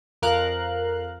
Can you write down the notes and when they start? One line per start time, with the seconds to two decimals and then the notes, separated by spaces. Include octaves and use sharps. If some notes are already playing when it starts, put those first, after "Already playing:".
0.22 F2 A#4 F5 F#6